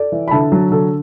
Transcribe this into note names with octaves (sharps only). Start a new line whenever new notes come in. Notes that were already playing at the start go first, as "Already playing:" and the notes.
Already playing: A4 D5
E3
B5
D3 E5 A5
F#3
D3 A4